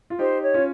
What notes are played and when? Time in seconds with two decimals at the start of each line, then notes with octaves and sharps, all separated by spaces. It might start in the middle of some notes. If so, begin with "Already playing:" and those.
0.10 F4
0.19 D#4 G4 C5
0.42 C#5
0.54 C#4 F4